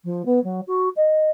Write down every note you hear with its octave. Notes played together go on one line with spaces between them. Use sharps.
F3
B3
F#3
F#4
D#5